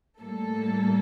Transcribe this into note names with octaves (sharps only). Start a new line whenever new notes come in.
A2 G3 A#3 A4